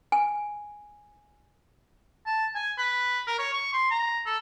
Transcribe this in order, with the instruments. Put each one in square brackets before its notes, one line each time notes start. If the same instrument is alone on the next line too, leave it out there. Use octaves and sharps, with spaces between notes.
[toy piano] G#5
[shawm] A5
G#5
B4
A#4
C#5
C#6
C6
A#5
A4